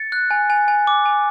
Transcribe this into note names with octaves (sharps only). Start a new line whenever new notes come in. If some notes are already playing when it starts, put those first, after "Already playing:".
Already playing: A6 C#7
F#6
G#5
G#5
G#5
D6
G#5